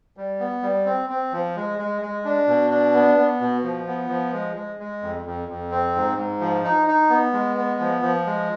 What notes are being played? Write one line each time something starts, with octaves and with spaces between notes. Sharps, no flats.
G3
B3
G3
C4
C4
F3
G#3
G#3
G#3
D4
B2
D4
B3
B3
B2
F3
B3
F3
G#3
G#3
G#3
F2
F2
F2
C4
G#2
G#2
F3
D#4
D#4
B3
G#3
B3
F3
F3
G#3